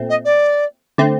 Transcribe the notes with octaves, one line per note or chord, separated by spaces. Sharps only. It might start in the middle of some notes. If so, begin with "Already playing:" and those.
Already playing: A#2 A3 C4
D#5
D5
D3 A3 C4